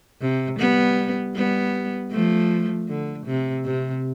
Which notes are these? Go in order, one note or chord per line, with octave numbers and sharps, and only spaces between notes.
C3
G3 B3
G3 B3
F3 A3
D3
C3
C3